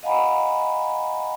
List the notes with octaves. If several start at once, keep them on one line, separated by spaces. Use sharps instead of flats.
D#5 F5 F#5 G#5 A#5 B5